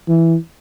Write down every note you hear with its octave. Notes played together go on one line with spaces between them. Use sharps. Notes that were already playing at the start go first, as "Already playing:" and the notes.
E3